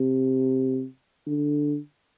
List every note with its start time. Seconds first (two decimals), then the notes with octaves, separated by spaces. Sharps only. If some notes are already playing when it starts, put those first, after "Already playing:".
Already playing: C3
1.27 D3